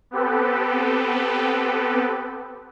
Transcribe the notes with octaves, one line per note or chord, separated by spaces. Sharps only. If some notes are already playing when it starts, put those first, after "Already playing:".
B3 C4 G4 A4 B4